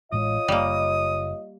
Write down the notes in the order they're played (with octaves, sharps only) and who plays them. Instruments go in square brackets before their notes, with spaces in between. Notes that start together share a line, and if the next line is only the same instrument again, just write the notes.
[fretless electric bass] A1 A2 G#3 [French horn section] F4 C#5 D#5 [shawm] D#6
[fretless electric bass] F#1 [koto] G3 A#3